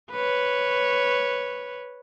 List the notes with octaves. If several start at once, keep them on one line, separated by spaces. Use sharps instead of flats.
B4 C#5